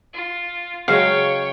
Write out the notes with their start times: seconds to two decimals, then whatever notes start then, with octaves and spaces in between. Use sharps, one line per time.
0.13 F4
0.88 C#3 F#3 G#3 C#5 F5 G5